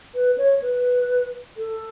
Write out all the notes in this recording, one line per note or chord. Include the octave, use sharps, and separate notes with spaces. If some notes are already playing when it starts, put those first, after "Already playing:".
B4
C#5
B4
A4